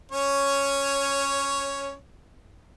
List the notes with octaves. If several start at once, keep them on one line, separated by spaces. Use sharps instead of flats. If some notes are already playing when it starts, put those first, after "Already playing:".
C#4 C#5